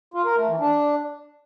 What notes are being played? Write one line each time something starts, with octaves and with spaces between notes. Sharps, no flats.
F4
A#4
A3
E3
D4